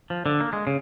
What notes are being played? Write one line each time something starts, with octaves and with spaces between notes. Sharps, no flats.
F3
D3
A#3
G#3
C#3